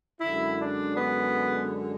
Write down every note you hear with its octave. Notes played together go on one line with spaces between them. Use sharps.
F#2 D3 G#3 E4
D4
B3